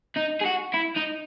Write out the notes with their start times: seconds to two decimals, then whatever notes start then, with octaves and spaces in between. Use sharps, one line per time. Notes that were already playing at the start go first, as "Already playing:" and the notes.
0.17 D#4
0.41 G#4
0.46 F#4
0.74 E4
0.97 D#4